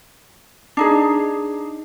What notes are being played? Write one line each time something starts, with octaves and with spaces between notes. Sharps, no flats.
D4 D#4 G#4